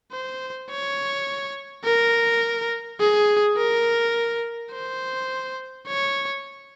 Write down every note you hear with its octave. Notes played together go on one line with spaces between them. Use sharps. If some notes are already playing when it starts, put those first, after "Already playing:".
C5
C#5
A#4
G#4
A#4
C5
C#5